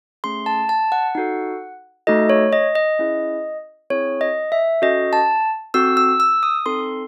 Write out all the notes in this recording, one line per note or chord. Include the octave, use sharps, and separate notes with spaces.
A3 C#4 G#4 C6
A5
A5
F#5
D#4 F#4 A4
A3 D#4 F#4 A4 D#5
C#5
D#5
D#5
C#4 E4 G#4
C4 E4 G#4 C#5
D#5
E5
C#4 F#4 A4 D#5
A5
C4 F#4 A4 E6
E6
E6
D#6
C4 D#4 A4 C6